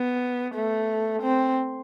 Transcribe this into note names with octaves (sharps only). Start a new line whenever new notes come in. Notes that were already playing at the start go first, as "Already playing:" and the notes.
Already playing: B3
A3
C4